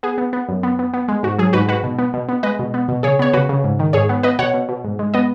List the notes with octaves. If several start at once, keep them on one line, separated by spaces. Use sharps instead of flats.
B3 G#4
B3
B3
F#2
B3
B3
B3
G#3
G#2 F#4
F#3 G#4
G#2 F#4 B4
G#2 F#4 B4
B2
B3
B2
B3
G#3 B4 D#5
B2
B3
B2
C#3 G#4 C#5
B3 C#5
C#3 F#4 B4
C#3
G#2
D#3
G#2 G#4 C#5
B3
B3 B4 D#5
B2 C#5 F#5
B2
B2
G#2
G#3
B3 B4 D#5